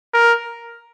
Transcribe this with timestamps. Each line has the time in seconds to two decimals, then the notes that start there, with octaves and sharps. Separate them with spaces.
0.14 A#4